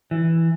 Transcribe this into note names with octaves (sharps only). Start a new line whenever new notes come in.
E3